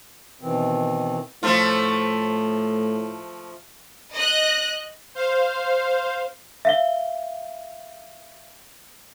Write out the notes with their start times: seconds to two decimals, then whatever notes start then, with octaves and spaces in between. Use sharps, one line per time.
0.41 B2 D#3 E3 C4
1.43 A2 F3 A3 F4
4.15 D#5 F#6
5.15 C5 F5
6.65 E5 F5 G7